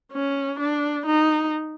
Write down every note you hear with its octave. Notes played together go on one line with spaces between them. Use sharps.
C#4
D4
D#4